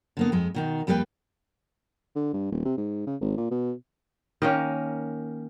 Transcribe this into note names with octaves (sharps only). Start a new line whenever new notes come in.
D3 A#3 B3
F2 G#3
B2 D#3 D#4
F2 G3 A#3 G4 B4 G5
D3
G2
D#1
C3
G#2
C#3
G#1
A#2
B2
D#3 A#3 C#4